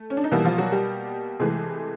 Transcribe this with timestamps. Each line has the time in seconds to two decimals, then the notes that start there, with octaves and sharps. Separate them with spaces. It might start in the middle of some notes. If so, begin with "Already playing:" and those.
Already playing: A3
0.10 C#4
0.17 D4
0.24 D#4
0.31 B2 E3 G3 A#3 E4
0.45 F3 F4
0.58 F#3 F#4
0.72 G3 G4
1.40 C3 E3 G#3 A3 G#4